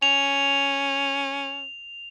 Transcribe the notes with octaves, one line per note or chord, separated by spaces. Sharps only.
C#4 F7